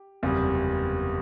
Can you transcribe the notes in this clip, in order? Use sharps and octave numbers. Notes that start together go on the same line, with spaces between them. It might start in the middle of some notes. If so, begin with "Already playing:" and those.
Already playing: G4
F#1 E2 C3 G3